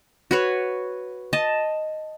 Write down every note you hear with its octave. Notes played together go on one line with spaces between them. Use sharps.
F#4 B4 C#5
D#5 A5